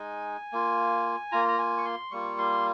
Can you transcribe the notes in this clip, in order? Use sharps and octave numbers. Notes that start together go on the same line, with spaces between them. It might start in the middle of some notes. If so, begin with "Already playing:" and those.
Already playing: G#3 D#4 G#5
A#3 F4
A#3 F4 A#5
A#5
G#5
C#6
C6
G3 A#3 F4 C#6
C6